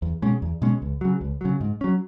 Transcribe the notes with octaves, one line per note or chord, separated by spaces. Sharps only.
E2
B2 G#3 C#4
E2
B2 G#3 C#4
C#2
C#3 F#3
C#2
C#3 F#3
G#2
F#3 C#4